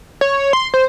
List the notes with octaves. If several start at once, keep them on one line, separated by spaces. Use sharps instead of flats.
C#5
C6
C5